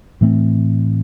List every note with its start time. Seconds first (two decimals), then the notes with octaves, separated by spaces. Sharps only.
0.21 A2 E3 A3 C4